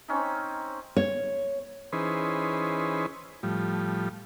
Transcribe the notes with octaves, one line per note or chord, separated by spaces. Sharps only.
C4 C#4 D#4
C#5
E3 C#4 D#4 G#4 B4 C5
A2 F3 G3